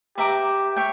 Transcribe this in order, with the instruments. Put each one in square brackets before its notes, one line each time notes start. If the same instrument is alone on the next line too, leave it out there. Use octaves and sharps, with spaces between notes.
[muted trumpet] G4 [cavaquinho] B4 E5 A#5 D6
[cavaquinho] C#5 E5 G5